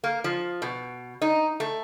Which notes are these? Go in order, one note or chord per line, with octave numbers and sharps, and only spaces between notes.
A#3
F3
B2
D#4
A3